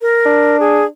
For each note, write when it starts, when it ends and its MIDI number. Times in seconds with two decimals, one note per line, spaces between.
0.02 0.59 70
0.26 0.87 62
0.60 0.84 68